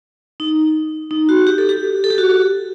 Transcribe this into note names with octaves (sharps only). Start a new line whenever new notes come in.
D#4
D#4
F#4
G4
A4
G4
A4
G4
F#4